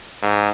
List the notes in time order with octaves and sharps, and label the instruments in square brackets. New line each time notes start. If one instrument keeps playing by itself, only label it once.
[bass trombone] G#2